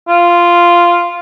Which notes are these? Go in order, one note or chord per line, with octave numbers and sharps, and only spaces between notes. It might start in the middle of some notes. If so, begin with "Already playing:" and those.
F4